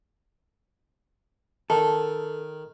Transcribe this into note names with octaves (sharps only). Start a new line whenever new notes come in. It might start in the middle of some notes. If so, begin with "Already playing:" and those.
D#3 A4